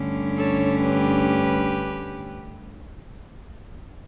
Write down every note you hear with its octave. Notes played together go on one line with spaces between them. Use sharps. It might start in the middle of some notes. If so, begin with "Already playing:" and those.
Already playing: G2 D3 A3 C#4
A4 C#5
G4 B4